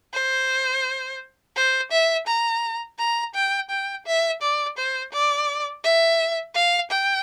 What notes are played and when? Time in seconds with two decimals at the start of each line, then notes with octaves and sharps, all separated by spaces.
0.13 C5
1.56 C5
1.91 E5
2.27 A#5
2.98 A#5
3.34 G5
3.70 G5
4.05 E5
4.42 D5
4.77 C5
5.12 D5
5.84 E5
6.54 F5
6.91 G5